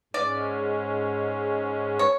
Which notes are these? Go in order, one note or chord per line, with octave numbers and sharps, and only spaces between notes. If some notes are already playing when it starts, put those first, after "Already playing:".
G#2 G#3 C#4 D5
C#5